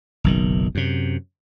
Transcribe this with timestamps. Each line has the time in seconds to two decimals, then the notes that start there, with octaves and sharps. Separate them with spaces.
0.24 F#1 B1 D#3
0.75 F#2 C3